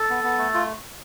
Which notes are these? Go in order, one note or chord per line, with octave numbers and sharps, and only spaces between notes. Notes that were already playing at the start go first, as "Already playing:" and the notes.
Already playing: A4
B3
B3
A3
F4